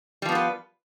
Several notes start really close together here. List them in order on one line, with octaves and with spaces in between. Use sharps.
G3 F3 B3 F4 B4